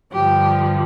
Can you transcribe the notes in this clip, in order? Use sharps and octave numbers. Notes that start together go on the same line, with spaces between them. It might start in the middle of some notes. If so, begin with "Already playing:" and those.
G2 D3 F3 G4